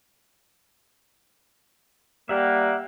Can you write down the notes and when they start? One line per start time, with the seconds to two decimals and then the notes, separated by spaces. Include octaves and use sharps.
2.29 G3 A#3 E5 F#5